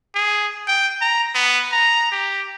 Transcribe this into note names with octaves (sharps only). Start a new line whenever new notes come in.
G#4
G5
A#5
B3
A#5
G4